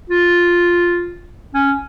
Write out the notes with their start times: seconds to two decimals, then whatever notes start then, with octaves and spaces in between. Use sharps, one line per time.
0.10 F4
1.54 C#4